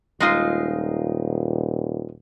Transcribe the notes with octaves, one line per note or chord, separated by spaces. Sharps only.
D#1 G#3 D#4 F4